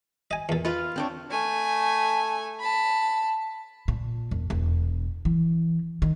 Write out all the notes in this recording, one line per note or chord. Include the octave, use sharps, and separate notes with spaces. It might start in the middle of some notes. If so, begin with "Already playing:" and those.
D#5 G#5
E2 A#2
F4 B4 F5
C4 D4 C#5
A3 G#5
A5 B5
A#2
E1
E1
E3
D#3